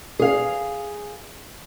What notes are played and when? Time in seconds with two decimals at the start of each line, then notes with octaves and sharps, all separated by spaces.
0.19 G#4 F5